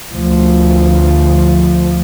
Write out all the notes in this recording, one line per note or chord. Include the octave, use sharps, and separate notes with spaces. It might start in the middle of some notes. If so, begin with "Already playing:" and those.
D2 F3